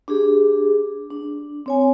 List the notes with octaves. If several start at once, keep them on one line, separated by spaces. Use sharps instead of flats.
D4 G4 G#4
D4
C4 C#5 G#5